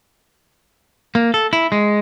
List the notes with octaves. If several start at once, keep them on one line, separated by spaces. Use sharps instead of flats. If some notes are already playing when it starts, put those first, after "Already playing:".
A#3
A4
E4
G#3